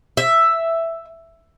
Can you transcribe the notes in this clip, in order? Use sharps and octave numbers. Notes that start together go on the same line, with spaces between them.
E5